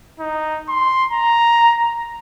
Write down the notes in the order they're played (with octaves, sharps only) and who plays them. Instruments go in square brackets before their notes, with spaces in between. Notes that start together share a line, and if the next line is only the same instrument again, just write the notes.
[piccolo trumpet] D#4
C6
A#5